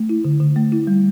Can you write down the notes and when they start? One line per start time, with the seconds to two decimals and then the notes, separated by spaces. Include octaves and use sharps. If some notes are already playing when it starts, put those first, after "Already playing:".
Already playing: A3
0.09 E4
0.25 D3
0.40 D3
0.56 A3
0.72 E4
0.87 G3